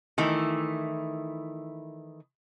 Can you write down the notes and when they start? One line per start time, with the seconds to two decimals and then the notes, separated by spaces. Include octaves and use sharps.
0.18 D#3 E3 A3 E4